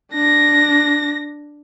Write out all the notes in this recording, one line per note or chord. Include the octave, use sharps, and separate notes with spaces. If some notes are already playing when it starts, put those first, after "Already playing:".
D4 A#6